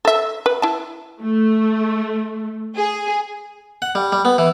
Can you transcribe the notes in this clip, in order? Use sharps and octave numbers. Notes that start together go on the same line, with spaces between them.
A4 E5
B4
E4 A5
A3
G#4
F#5
G3
G3
B3
E3